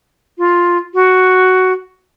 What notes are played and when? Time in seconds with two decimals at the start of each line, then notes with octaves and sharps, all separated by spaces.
0.38 F4
0.94 F#4